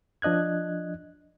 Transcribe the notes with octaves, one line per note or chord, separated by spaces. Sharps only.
F3 D4 D#5 F#6 G#6